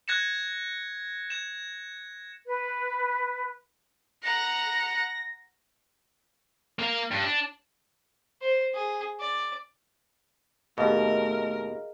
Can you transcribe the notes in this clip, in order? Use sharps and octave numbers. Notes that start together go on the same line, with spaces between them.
F#6 G#6 A#6 C#7 E7
G#6 E7
B4
F#5 A#5 A#6
A#3 F5
G2
D4
C5
G#4
D5
D#2 B2 A3 G#4 A#4 D#5 F5